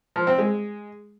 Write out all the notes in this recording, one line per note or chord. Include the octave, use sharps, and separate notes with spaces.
F3
C4
G#3